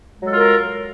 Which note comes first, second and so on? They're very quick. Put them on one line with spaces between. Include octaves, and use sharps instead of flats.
G#3 F#3 A4 F4 A#4